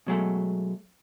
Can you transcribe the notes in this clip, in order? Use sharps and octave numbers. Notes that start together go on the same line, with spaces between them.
B2 F#3 G#3 A3